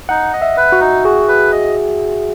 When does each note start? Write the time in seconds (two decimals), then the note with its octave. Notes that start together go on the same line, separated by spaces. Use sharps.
0.09 D#4 F#5
0.33 D#5
0.42 E5
0.57 B4
0.72 F#4
0.81 D#4
1.04 F#4 G#4
1.28 B4
1.52 D#5